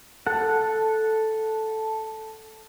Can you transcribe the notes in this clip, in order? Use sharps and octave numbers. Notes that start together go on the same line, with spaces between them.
A4 F#5